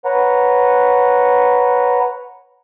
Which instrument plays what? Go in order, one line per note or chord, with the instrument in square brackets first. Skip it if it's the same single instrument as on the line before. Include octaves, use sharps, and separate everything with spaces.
[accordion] B4 C#5 F#5 A#5